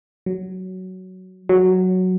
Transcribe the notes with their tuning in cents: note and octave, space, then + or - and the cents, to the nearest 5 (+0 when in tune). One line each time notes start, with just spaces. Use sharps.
F#3 +10
F#3 +0